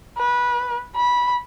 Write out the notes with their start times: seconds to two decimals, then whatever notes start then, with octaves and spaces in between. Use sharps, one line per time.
0.18 B4
0.96 B5